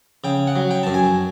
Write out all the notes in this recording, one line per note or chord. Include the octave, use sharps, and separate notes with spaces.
C#3 G5
F#5
F#3
G5
F#2 A5
G#5